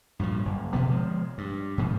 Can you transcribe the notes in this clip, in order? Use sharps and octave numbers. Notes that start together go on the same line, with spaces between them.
G2 A#2 C#3 F3
F#1
B2 D3 F3 B3
F3 G#3
G2
G#2 B2 D3 F3